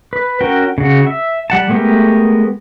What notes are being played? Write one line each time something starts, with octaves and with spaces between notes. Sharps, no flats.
B4
C#4 F#4 A#4 G5
C#3 F#4
E5
G3 F#5 A5
G#3 A3 B3 G4 A#4